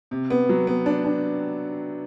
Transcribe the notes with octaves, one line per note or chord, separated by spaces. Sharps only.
C3
B3
F#3
B3
D4
D4